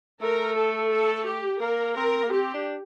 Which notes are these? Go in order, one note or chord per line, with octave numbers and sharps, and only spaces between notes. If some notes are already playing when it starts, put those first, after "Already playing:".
A3 A#4
A4
A4
G4
A#3 A#4
C4 A#4
A#3
C4 G4
D4